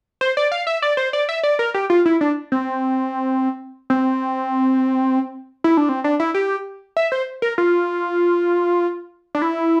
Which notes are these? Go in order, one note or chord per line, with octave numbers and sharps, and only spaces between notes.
C5
D5
F5
E5
D5
C5
D5
E5
D5
A#4
G4
F4
E4
D4
C4
C4
E4
D4
C4
D4
E4
G4
E5
C5
A#4
F4
D4
E4